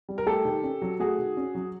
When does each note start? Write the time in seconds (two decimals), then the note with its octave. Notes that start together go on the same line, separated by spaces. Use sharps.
0.09 G3
0.18 A#4
0.26 A3 G4 A4
0.45 D#3
0.63 C#4
0.82 F#3
1.00 A3 F#4 G#4
1.18 D#3
1.37 C#4
1.55 F#3